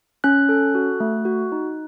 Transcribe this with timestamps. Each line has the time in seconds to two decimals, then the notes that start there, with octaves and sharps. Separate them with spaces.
0.24 C#4 F#6
0.49 A4
0.75 F#4
1.00 A3
1.25 F#4
1.52 D#4